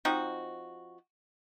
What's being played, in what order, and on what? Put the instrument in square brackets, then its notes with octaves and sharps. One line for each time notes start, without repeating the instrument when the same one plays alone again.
[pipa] F3 C4 D#4 F#4